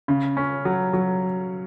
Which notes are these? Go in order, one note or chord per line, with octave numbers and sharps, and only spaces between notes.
C#3
C#4
F#3
F#3